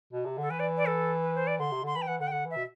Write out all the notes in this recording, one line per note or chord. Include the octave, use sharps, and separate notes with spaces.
B2
C3
D3 A4
E3 B4
D5
D5
A4
B4
C5
D5
D3 C6
C3
D3 C6
E3 B5
G5
E3 F#5
D3 F#5
G5
D3 F#5
E3
E5
B2